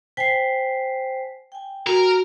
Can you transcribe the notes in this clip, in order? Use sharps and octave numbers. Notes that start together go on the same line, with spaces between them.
C5 G5 G#5 B6 C7
G5 G#5
F#4 A#4